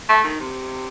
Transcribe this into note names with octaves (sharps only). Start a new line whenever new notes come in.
A3
D#3
C3